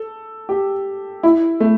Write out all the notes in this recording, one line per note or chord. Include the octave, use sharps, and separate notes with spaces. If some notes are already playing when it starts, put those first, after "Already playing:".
Already playing: A4
G4
E4
A3